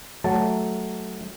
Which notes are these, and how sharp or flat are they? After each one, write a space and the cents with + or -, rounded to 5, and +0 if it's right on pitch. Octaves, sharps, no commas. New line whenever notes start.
F#3 +15 A3 +0 A5 +0